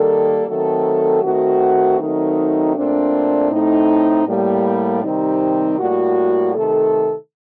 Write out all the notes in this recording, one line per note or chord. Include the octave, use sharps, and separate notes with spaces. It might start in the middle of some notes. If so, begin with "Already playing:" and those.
Already playing: D#3 G3 A#3 A4
D#3 F#3 A3 C4 A4
D#3 A3 C4 F#4
D#3 F#3 A3 C4 D#4
A#2 A3 C4 D4
A2 A3 C4 D#4
A2 G3 A#3
C3 D#3 G3 C4 D#4
A2 G3 A#3 F#4
C3 D#3 A3 A4